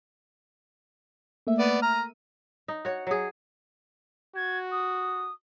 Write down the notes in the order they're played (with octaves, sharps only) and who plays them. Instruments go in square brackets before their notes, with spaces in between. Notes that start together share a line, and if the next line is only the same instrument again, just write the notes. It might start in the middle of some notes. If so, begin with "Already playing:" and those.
[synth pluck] A3 A#3 E5
[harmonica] B3 D5 [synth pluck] D#7
[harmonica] A#5 F6
[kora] D#4
F#4 C#5
F#3 G#4
[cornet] F#4 [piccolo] G#6
[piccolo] D#6